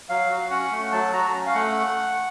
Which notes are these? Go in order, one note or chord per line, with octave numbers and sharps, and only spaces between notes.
F#3 F5
F#4
C#4 F#5
A3
F#3 A5
F#4 A#5
C#4
F5
A3 F#5